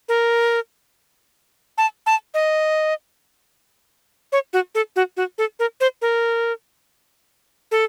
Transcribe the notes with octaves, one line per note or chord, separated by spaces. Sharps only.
A#4
A5
A5
D#5
C#5
F#4
A4
F#4
F#4
A4
A#4
C5
A#4
A4